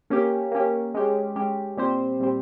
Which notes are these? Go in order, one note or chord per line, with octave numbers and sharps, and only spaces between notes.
A#3 C#4 G4
A#3 C#4 G4
G#3 C#4 G4
G#3 C#4 G4
A#2 G3 C4 G4 C5
A#2 G3 C4 G4 C5